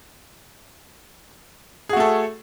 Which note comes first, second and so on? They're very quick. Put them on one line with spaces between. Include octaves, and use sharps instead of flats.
G#4 F#4 A3 A4